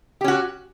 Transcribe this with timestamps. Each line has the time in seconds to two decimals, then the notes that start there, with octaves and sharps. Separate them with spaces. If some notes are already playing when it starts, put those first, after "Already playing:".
0.21 G4
0.24 C#4
0.28 F#4